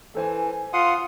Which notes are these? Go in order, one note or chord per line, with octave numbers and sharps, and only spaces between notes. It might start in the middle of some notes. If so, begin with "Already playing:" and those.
E3 A4 C5 G#5
F4 F#5 C6 D#6